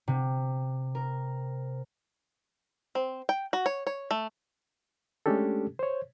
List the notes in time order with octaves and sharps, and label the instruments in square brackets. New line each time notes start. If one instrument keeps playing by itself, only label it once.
[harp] C3
A#4
[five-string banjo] C4
G5
F#4
C#5
C#5
A3
[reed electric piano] G#3 A3 C#4 D4 G4 A4
C5 C#5